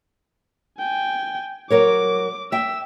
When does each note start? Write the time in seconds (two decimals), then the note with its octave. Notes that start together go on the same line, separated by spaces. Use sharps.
0.79 G5 G#5
1.70 F#3 A#4 C#5 D6
2.52 E5 G5 E6